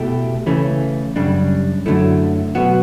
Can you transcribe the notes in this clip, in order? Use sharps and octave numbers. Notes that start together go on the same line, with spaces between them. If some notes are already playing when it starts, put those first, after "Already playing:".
Already playing: B2 A3 E4 G4
C#3 E3 A3 C#4
F#2 C#3 G3 D4
F#2 D3 F#3 A3 E4
B2 F#3 B3 F#4